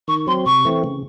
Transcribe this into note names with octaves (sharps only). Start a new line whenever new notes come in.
D#3 C#6
F#3 C4 C6
C3 C#6
E3 A3 C4
C#3